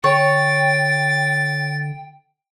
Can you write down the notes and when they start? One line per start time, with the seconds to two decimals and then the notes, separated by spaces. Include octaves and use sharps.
0.04 D3 C#5 G5 A6